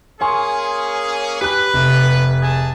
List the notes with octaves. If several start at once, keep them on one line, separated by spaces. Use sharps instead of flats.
A#3 C#4 G#4 G#5 C6 C#6
G4 B4 B5 F#6
F1
G#4 A5